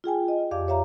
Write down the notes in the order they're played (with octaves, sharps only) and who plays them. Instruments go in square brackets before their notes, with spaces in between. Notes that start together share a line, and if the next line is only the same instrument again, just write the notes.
[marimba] F4 G#4 G5 G#5
D#5
F2 G4 D5 F5 D6
C#5 E5 F5 A#5